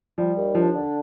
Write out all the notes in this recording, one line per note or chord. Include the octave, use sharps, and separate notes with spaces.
F3 G3
D#2
F3 D4
D3